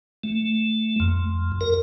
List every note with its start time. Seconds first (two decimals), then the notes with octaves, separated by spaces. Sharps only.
0.24 A3
1.00 F2
1.61 A#4